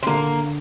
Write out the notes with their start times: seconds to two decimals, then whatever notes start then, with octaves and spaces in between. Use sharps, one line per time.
0.03 C4
0.07 D3 A#3